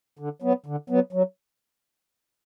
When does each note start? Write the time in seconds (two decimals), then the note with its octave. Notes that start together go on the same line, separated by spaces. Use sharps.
0.19 D3
0.42 F#3 B3
0.66 D3
0.90 F#3 B3
1.13 F#3